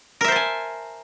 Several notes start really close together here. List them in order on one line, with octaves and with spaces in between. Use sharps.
A#4 E5 C5 A5 G#5